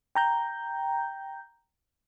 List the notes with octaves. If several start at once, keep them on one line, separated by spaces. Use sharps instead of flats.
G5 A#5 G6